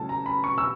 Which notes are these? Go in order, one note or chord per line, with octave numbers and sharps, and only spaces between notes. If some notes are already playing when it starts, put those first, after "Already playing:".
Already playing: C#3 F#3 A3 C#4 E4 A5
A#5
B5
C#6
E6